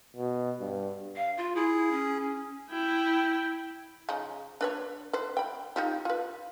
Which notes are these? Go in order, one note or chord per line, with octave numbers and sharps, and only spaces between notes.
B2
G2
F5
F4
E4 G#4
C#4
E4 G5
C#3 F3 D#4
D4 B4 C#5
B4 C5
G5 B5
D#4 F4 G4
F4 B4